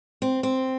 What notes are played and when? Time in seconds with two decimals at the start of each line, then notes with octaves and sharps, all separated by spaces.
0.22 C4
0.43 C4